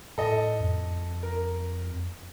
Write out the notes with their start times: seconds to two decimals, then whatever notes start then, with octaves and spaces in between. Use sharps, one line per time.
0.18 A2 A4 D#5
0.60 F2
1.23 A#4